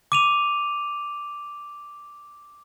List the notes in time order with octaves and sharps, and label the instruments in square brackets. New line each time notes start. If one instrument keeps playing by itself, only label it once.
[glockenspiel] D6 D#7 F7